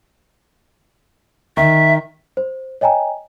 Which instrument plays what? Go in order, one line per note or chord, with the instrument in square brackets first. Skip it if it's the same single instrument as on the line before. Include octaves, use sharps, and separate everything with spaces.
[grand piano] D#3 [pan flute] E5
[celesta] C5
C#5 D#5 G5 G#5 A#5